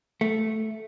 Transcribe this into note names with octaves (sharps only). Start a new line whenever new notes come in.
A3